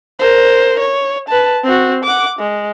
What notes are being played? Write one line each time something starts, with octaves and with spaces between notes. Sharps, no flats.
A#4 C5
C#5
B4 A5
C4 F#4
F#5 D6
G#3